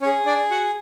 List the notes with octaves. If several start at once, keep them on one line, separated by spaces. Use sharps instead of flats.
C#4 C#5
G#4
D4 D5
F#4 F#5